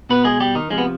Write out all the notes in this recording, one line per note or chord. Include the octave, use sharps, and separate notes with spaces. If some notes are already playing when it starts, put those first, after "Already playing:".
B2 B3 B4
G#3 G#4
G3 G4
D#3 D#4
C3 F3 G#3
B3